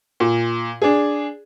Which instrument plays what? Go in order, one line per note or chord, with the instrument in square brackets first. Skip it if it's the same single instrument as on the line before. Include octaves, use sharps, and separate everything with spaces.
[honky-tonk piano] A#2
D4 G#4